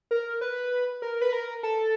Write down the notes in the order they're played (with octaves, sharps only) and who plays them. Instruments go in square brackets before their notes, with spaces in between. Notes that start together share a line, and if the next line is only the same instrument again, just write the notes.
[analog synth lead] A#4
B4
A#4
B4
A#4
A4